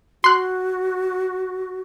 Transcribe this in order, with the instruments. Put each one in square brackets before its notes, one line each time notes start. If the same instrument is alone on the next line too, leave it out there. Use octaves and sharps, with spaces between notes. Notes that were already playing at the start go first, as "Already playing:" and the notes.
[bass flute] F#4 [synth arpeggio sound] C6 F#6